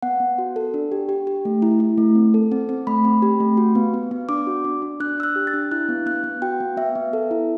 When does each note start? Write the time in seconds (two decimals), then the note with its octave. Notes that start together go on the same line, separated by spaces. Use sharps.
0.02 B3 F#5
0.20 B3
0.38 F#4
0.56 A4
0.74 D4
0.92 G4
1.09 G4
1.27 G4
1.45 A3
1.62 E4
1.80 E4
1.98 A3
2.15 C4
2.34 A4
2.52 C4
2.69 C4
2.87 A3 B5
3.05 C4
3.22 G4
3.40 A3
3.57 F#4
3.75 B3
3.94 B3
4.11 B3
4.29 D4 D6
4.47 F#4
4.64 D4
4.82 D4
5.00 D4 F#6
5.18 D4 E6
5.23 F#6
5.36 G4
5.47 A6
5.54 D4
5.71 E4 F#6
5.89 B3
6.06 B3 F#6
6.24 B3
6.42 F#4 G5
6.60 B3
6.77 B3 E5
6.95 B3
7.13 A4
7.31 E4